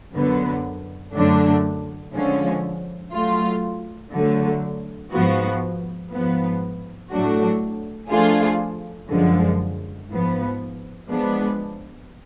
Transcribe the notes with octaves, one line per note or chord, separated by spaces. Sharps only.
F#2 D3 F#3 B3
F#2 D3 F#3 A3 D4
D3 F3 G#3 C#4
F#3 A3 F4
D3 F#3 A3
G#2 F3 B3 F#4
G#2 F3 B3
A2 F#3 A3 D4 F#4
F3 A3 D4 F4 G#4
F#2 D3 F3 G#3
G#2 F3 B3
F3 G#3 B3 D4